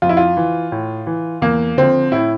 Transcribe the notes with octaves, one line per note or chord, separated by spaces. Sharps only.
F2 F4
E4
F4
E3
A2
E3
E2 A#3
D3 F3 C4
A2 E4